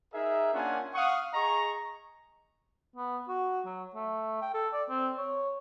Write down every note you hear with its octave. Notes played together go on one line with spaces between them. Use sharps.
D#4 G#4 A#4 E5
A#3 C#4 D4 F4 F#5 G#5
F5 F#5 C#6 D#6
G#4 D#5 A#5 C#6
B3
F#4
F#3
A3
G5
A4
D5
C4
C#5